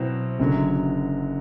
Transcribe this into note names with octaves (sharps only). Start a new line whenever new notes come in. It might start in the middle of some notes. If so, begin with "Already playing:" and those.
Already playing: B2 F#3 C4 E4
F#1 F#2 D3 F#3